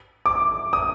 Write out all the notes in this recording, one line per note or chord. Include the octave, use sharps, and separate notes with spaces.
D6
D#6